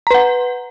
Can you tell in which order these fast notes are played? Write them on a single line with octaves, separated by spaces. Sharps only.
A#5 B4 F#5